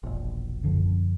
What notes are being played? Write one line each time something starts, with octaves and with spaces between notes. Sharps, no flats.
E1 A#1
F#2 D3 F3